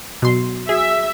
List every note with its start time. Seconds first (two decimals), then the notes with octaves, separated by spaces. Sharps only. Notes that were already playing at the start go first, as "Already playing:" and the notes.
0.22 B2 F#3 B3 F#4 C6
0.69 F#4 G#4 E5